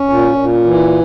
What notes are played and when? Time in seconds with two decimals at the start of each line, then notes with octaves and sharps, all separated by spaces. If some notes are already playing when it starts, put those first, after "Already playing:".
Already playing: C#4
0.09 A#2
0.36 A#2
0.65 E3